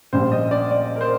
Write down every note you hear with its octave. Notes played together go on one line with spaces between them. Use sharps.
A#1 A#2 G3 C5
D#5
D5
D5
A#4
C5